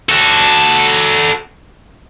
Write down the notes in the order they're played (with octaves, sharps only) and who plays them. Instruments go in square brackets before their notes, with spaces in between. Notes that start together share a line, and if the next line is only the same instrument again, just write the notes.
[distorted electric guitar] F#4 A4